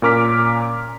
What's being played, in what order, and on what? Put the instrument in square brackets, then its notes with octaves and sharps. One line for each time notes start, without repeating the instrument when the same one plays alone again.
[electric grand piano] A#2 C#4 A#4 D6 F6 B6